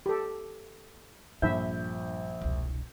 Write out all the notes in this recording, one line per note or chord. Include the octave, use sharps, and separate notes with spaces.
G4 A4
A#1 G2 E5 B5 G6
E1 C2